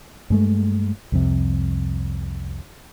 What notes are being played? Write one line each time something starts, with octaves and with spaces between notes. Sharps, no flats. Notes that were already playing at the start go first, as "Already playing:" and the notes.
G2 G#3 A3
C2 F2 C3